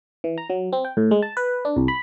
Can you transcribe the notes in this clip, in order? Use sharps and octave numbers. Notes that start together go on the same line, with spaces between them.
E3
A#5
F#3
C4
G5
A2
G#3
A5
B4
D4
C2
B5